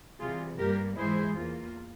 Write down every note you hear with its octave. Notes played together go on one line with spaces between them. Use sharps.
C3 E3 G3 F4 G#4
G2 G3 A#3 G4 A#4
G#2 E3 G#3 E4 G#4 C5
E2 E3 A#3 F4